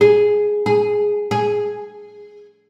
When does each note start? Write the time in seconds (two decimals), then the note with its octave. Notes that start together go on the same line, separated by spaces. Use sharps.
0.01 G#4
0.66 G#4
1.31 G#4